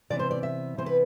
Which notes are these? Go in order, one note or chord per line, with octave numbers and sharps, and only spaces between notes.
C3 E3 B3 D5
C5
D5
E5
C3 E3 B3 C5
B4